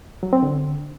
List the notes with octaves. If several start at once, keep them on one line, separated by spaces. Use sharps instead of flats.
F#3
C4
D3